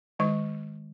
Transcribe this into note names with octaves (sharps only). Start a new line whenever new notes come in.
D#3 G#3 C#6